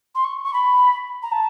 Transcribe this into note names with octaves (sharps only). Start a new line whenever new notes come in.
C6
C#6
C#6
B5
A#5
A5